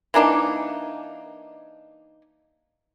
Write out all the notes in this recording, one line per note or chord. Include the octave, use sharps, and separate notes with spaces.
E3 A#3 D4 D#4